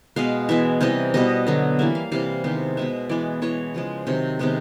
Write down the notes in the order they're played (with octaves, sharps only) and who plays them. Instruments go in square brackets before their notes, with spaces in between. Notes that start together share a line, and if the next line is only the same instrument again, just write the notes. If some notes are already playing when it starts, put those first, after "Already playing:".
[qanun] B2 G#3 B3 F5
E3 G#3 B3 E5
C3 E3 G3 B3 D#5
B2 G3 B3 D#5
D3 F#3 B3
E3 G3 A#3 E5
F5
C3 E3 G3 F5
C3 D#3 G#3 B3
B2 G#3 B3 E5
E3 G#3 B3 D5
E3 G#3 B3 C#5
C#3 F3 G#3
C3 D#3 F#3
C3 D#3 G#3 B3